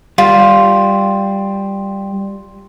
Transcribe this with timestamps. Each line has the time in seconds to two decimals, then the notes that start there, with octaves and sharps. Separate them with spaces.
0.18 G3 F4